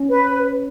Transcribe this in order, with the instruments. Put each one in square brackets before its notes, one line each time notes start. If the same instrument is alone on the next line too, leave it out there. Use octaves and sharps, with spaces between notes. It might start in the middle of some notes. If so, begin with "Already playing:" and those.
Already playing: [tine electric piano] C#4
[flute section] B4